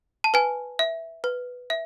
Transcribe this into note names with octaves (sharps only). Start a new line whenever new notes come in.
A5
B4 G#5
E5
B4
E5